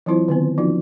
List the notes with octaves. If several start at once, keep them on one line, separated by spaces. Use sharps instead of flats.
E3 F#3 C4 E4 F4 C5
D3 D#3 B3 C4
F3 B3 C#4 D#4 F4 F#4